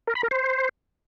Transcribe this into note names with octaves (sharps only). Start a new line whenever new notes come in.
A#4
B5
A#4
C5